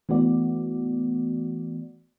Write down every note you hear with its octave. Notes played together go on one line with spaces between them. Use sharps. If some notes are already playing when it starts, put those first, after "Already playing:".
E3 A3 B3 F#4 D5